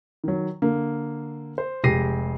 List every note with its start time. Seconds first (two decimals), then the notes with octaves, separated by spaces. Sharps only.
0.24 D#3 F#3
0.62 D3 A#3
1.58 C5
1.84 F1 G#3 G4 A#6 C7 D#7